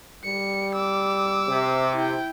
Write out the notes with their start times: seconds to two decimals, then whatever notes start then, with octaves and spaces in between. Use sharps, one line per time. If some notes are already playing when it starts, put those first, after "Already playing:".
0.24 G3 C#7
0.75 D6 E6
1.48 C3
1.96 E4 G5